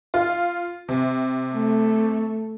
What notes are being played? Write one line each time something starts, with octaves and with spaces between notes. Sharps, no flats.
F4
C3
A3